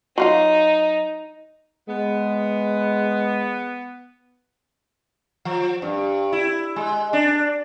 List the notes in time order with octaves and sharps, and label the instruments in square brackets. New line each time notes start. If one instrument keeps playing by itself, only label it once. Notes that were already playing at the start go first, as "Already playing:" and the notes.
[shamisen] F#3 F4 F5 [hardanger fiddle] D#4
[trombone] G#3 [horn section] B3
[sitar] F3
G2
E4
G#3
D4